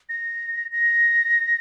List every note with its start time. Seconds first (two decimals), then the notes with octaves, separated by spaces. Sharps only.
0.09 A#6
0.72 A#6